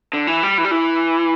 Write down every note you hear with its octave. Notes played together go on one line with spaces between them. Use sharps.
D3
E3
G3
E3
G3
E3